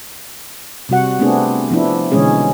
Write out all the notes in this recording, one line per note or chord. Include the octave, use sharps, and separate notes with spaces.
C3 G3 F#4 F#5
A3 B3 C4 D4 G#4
F3 B3 D4 E4
B2 D3 E3 G#3 C#4 G#4